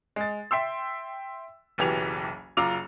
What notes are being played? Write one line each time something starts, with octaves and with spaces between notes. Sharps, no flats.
G#3 A6
E5 G5 C6 E6
F#1 B1 E3 G4 G#6 F7
F#1 F4 A#5 D6 E6 F7